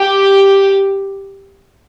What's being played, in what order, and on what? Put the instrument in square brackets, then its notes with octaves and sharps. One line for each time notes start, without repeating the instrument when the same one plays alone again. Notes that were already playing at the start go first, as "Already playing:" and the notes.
Already playing: [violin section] G4